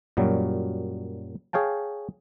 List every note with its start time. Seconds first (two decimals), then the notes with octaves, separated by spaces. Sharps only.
0.17 F#2 A#2 F#3 G3
1.53 G#4 C#5 F5 G5 A5